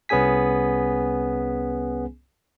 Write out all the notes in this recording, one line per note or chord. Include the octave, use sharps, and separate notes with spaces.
C2 B3 C#4 G#4 G#5 B6